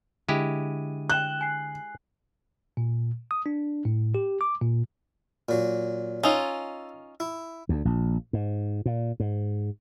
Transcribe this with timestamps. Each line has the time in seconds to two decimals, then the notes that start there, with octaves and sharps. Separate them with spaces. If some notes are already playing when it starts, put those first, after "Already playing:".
0.29 D3 G#3 E4 G4 D#7
1.10 G5 F#6 E7 G7
1.41 G#5 C7
2.77 A#2
3.31 D#6
3.46 D4
3.85 A2
4.15 G4
4.41 D6
4.61 A#2
5.49 A#2 F#3
6.23 C#4 D#4 F4 A4
7.20 E4
7.69 D2
7.85 A#1
8.33 G#2
8.86 A#2
9.20 G#2